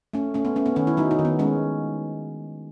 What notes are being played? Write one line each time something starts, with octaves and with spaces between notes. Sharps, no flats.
A3 C#4
A3 C#4
B3
A3 C#4
B3
D#3 C#4
E4
F#3 D#4
D#4
D#3
B3
G#3 C#4